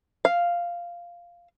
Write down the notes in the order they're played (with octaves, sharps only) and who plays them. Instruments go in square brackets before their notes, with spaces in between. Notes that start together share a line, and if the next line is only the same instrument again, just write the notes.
[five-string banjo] F5